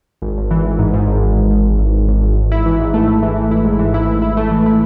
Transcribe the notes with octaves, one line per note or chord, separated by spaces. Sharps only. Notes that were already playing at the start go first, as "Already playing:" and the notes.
G#1
G#1
E3
G#1
G#2
G#2
G#1
G#1
G#1
G#1
G#1
G#1
G#1
G#1
G#1
G#1
E4
E3
G#2
A3
E4
E3
E3
E4
G#2
E3
E4
E4
E4
A3
E3
E4